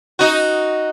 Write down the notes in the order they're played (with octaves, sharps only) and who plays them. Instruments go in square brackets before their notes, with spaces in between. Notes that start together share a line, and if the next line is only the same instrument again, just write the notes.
[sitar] D#4 F#4